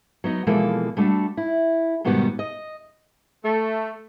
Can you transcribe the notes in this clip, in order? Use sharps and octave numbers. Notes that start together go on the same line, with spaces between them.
F#3 B3 D#4
B2 E3 F3 G#3 A#3 A4
G3 A3 D4 F4 F#4 A4
E4
G#2 B2 D#3 G3 B3 F#4
D#5
A3